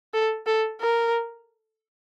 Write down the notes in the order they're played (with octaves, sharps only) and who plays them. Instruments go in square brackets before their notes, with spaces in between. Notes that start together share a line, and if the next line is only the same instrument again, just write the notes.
[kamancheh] A4
A4
A#4